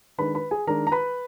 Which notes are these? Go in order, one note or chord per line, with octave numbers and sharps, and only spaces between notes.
D#3 G#3 D4 B4 B5
B4 B5
G#4 G#5
D#3 G#3 D4 A#4 A#5
A#5
B4 B5